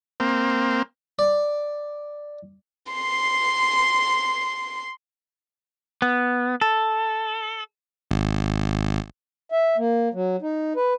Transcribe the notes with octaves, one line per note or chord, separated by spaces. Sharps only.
A#3 C4
D5
C6 C7
B3
A4
G#1
E5
A#3
F#3
D#4
B4